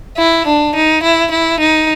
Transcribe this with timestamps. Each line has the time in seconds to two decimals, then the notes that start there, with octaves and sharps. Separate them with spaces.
0.17 E4
0.47 D4
0.75 D#4
1.03 E4
1.31 E4
1.60 D#4